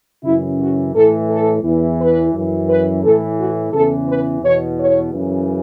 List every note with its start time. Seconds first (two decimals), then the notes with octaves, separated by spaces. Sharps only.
0.24 F#2 C#3 E3 E4
0.59 F#4
0.93 A2 E3 A4
1.29 A4
1.63 E2 E3
1.99 B4
2.33 F#2 E3
2.68 B4
3.02 A2 E3 A4
3.38 F#4
3.72 E2 C#3 E3 A4
4.07 B4
4.42 E2 B2 C#5
4.77 C#5
5.12 F#2 C#3 E3